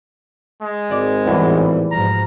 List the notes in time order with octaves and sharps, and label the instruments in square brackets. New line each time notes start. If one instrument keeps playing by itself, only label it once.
[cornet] G#3
[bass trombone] G#1 [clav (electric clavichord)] D5
[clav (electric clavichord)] E2 [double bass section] A2 E3 G3
[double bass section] G#2 B2 F3 [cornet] A#5